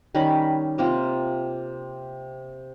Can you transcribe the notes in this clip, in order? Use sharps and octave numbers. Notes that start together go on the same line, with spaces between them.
D#3 G3 C#4 B5
C3 A#3 C4 F4